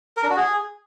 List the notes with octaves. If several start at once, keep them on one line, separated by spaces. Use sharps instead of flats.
A#4
D4
F#4
G#4